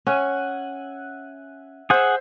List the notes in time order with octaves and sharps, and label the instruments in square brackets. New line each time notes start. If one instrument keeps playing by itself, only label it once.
[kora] C#4 [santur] E5 F#5 G#5
[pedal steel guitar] G#4 F#5 [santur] C5 E5